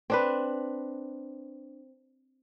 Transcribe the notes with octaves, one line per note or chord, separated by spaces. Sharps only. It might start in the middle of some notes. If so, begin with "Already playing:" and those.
C4 D4 B4